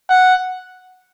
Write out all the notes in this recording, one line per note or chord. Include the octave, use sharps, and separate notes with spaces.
F#5